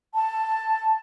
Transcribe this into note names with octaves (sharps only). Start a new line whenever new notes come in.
A5